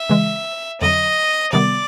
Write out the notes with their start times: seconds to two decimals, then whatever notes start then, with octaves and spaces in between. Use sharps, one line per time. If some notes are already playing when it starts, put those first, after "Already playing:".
Already playing: E5
0.09 C#3 E3 G#3
0.80 F2 D3 F#3 D#5
1.53 C3 D#3 G3 B3 D5